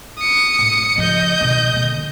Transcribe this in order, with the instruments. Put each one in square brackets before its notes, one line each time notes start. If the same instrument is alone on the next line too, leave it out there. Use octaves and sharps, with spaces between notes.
[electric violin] D#6 C#7
[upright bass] A2
[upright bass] C#3 F3 [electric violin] D#5 G6
[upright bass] B2 D#3
D3 A#3